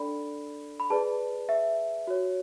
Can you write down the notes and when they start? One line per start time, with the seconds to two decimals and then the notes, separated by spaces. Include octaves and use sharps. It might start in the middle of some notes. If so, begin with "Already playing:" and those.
Already playing: D4 A4 D5 B5
0.80 B5
0.90 G#4 B4 D5 A5
1.49 E5
2.07 F#4 C#5